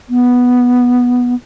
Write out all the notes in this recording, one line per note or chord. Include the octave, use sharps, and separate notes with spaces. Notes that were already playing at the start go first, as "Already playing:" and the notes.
B3